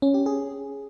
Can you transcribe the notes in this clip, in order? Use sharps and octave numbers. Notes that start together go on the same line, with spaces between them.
C#4
G4
G#4